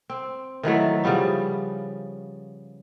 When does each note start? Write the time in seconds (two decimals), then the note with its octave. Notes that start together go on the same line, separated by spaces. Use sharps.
0.10 C4
0.63 D#3 E3 F#3 A3
1.04 C#3 F3 G3 B3